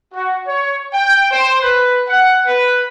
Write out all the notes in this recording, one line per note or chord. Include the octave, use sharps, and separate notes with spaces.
F#4
C#5
G5
C5
B4
F#5
B4